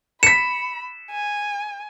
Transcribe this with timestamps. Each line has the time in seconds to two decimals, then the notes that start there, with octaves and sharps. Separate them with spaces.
0.23 B5 B6 C#7 E7
1.11 G#5